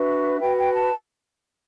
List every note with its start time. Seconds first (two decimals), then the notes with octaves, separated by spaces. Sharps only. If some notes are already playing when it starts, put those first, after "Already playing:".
Already playing: D4 F#4 B4 E5
0.40 F#4 B4 G5
0.57 G5
0.74 A5